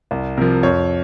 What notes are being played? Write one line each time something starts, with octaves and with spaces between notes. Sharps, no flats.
C2
C3 F3 A#4
F2 C#5